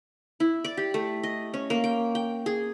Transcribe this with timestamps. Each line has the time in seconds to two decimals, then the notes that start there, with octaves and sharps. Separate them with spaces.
0.40 E4
0.64 D5
0.77 G4
0.94 A3
1.23 D#5
1.54 C#4
1.70 A#3
1.84 G5
2.15 G5
2.46 G#4